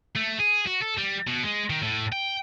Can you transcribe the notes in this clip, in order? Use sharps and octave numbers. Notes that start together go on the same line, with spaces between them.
A3
G#4
F#4
A4
G3
B2
G#3
D#3
A2
G5